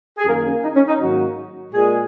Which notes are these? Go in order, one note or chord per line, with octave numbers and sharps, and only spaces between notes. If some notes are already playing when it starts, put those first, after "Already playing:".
G#4
F#2 D#3 F#3 A#3 A#4
C#4
D#4
C#4
D#4
G#2 D#3 F#3 A#3 F#4
A#2 G#3 G#4